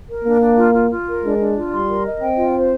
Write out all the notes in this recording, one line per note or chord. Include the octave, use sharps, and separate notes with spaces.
A#4
A#3 D4
D4
F4
F4
F4
A#4
G#3 D4
D4
F4
G3 C6
A#4
D#5
C4 G5
F4
C5